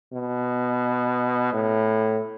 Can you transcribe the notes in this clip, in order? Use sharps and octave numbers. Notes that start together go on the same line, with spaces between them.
B2
A2